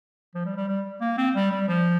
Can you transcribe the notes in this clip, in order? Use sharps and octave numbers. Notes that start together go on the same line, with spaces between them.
F3
G3
G3
G3
A#3
C4
G3
G3
F3